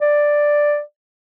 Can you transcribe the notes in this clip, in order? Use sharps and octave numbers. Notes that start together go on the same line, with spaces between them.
D5